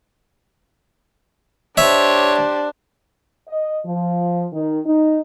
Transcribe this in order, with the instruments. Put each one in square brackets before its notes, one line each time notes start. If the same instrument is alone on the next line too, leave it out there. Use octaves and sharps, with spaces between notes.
[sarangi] D4 [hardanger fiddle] G4 C5 [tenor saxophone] C#5 [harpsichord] E5
[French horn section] D#5
F3
D#3
D#4